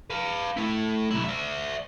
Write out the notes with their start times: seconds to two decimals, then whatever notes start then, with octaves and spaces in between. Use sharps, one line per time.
0.10 B4 F5
0.57 A3 E4
1.11 B1 E4
1.25 D5 E5